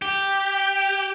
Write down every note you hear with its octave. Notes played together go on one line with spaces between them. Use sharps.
G4